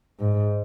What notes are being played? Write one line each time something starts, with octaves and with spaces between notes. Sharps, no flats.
G#2